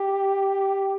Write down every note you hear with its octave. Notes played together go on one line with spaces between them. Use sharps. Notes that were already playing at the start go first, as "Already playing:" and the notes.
Already playing: G4